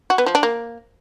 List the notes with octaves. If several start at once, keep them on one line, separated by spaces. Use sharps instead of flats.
F#4
B3
F3
D4
A#3